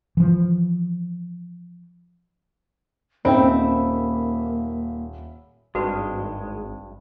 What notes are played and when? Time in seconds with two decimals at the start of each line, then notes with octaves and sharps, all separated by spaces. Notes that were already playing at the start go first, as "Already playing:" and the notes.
0.17 E3 F3
3.25 D#1 A#3 C4 D#4 E5 B5
5.75 G#1 G2 G#3 F#4 B4